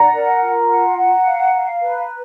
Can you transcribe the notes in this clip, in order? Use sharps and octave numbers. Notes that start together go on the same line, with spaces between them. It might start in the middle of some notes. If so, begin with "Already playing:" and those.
Already playing: D5 F#5 A#5
A#4
F4
F#5
F#5
F5
F5
B4